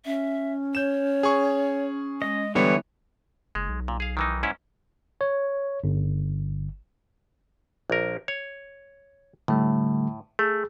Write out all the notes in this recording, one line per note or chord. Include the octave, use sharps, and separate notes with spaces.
C#4 E5
C#5 G6 E7
G#4 C#6
G#3 D#5
D3 E3 G3 B3 C#5
F#1 G#3
B1
A#2
G#4 F5
D#3 E3 D#4
G#2 C#4 E4
C#5
G1
A#1 A#4
C#5
A2 D3 G3 A3
A3 G#4